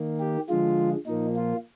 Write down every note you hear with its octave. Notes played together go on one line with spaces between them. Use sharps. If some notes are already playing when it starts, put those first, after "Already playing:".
Already playing: D#3 A#3
G4
D3 F3 G#3 F4
A#2 F3 A#3 D#4
F4